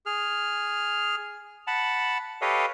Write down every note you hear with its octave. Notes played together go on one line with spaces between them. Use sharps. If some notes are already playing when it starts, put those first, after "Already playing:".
G#4 F6
F#5 A5 B5
G4 A4 B4 C#5 D#5 F5